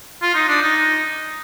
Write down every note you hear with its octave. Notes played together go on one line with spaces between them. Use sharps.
F4
D#4
D4
D#4